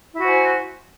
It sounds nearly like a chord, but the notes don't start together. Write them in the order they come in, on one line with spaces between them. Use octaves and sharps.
E4 F#4 C5 G#5